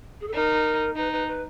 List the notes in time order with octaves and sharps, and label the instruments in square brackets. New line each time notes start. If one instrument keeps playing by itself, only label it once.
[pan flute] G#4
A4
[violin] D#4 [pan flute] A#4
[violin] D#4 [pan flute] B4
[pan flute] B4
B4